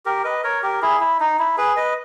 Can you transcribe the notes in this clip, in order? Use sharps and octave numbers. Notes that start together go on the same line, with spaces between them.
G4 A#4
B4 D#5
A#4 C#5
G4 A#4
E4 G#4
E4
D#4
E4
G#4 B4
B4 D#5